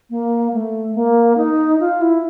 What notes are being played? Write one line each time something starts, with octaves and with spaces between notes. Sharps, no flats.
A#3
A3
A#3
D#4
F4
E4